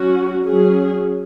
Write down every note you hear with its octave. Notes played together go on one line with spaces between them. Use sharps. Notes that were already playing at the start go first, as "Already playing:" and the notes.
Already playing: F#3 C#4 F#4
F#3 C#4 G#4